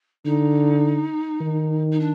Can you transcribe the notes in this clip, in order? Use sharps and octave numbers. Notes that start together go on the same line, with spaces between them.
D3 D#4
D#3
D#4
D4